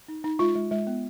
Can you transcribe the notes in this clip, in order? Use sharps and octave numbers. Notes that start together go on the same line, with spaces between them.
D#4
D#4
G#3 F4
G#3
G#3
B3